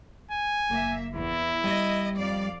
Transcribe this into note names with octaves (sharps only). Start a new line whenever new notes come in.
G#5
F#1 A#3 E5
E2 E4
G3 D#5
F2 D5 F5